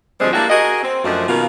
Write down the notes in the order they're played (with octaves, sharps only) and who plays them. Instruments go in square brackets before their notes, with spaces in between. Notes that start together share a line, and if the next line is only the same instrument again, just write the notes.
[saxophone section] D2 F3 G3 G#3 C4 C5
A#3 D4 E4 F#4 G4
F#4 G#4 A#4 D#5
C4
F#2 F3 A3 D4 F#4 D#5
B2 D#3 A#3 B3 F4